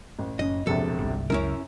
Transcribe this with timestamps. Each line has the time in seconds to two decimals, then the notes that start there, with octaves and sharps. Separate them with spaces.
0.19 A1
0.39 F#1 C#4 D#5
0.67 E1 A#1 C3 F3 A4
0.99 G1 C2
1.30 C#2 F#2 C#3 C#4 E4 A#4